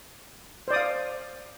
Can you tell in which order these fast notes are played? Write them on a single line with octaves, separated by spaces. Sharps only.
C5 D5 D#6 F5